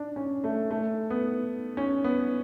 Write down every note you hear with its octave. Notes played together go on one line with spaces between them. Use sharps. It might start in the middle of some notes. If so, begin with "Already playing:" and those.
Already playing: D4
C#4
A3
A3
B3
C#4
B3